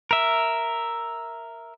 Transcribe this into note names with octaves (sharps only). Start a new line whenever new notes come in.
A#4 E5